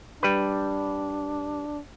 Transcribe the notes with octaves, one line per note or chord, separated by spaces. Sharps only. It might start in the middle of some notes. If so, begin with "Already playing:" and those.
G3 D4 B4